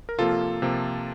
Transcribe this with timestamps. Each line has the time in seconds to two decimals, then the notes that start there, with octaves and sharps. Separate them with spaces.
0.09 A#4
0.19 C3 F3 A#3 F4 A4
0.62 C3 F3 A#3